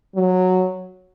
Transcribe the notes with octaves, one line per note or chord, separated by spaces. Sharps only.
F#3